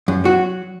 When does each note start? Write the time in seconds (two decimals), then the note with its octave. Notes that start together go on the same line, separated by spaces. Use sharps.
0.08 F#2
0.24 F#3 F#4